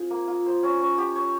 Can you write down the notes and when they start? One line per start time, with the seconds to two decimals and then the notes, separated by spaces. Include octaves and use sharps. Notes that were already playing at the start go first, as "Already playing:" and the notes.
Already playing: C4 F4 G#4
0.11 A#3
0.28 F4
0.46 C5
0.63 C#4
0.81 C#4
0.98 G4
1.16 C#5